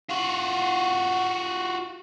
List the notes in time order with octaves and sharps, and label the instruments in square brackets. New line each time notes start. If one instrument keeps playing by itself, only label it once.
[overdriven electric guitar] F4 F#4